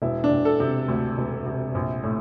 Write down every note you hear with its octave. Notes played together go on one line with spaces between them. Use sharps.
E1 E4
D4
E1
A4
C3
D2
E1
C3
A#1
A2